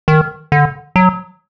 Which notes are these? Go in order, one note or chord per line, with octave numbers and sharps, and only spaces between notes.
D#3
D3
F#3